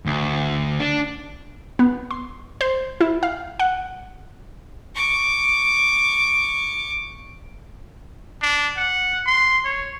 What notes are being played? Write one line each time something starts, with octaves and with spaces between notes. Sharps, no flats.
D2
D4
B3
C6
C5
E4
F5
F#5
C#6 D6
D4
F#5
C6
C#5